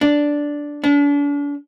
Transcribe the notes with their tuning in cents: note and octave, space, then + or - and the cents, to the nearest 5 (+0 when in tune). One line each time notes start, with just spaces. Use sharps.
D4 -5
D4 -40